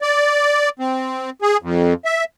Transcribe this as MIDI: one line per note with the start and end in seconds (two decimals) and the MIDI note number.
0.02 0.69 74
0.79 1.30 60
1.42 1.57 68
1.62 1.94 41
2.05 2.24 76